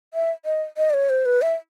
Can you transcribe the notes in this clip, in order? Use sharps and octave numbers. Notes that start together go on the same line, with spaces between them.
E5
D#5
D#5
D5
C#5
C5
B4
E5